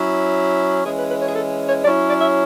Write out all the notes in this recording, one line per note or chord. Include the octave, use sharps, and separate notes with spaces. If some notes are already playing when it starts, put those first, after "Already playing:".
Already playing: F#3 C#4 E4
E3 G#3 C#4 G#4
B4
B4
C#5
G#4
A4
C#5
F#3 C#4 E4 D5
D5
E5